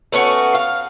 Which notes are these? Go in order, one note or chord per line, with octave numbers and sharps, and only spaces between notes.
A3 B3 C#4 F#4
F5